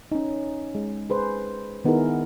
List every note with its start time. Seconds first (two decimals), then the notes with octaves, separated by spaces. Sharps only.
0.12 C#4 D#4
0.75 G#3
1.10 G#4 B4 C5
1.85 D#3 B3 D#4 E4 G#4 A#4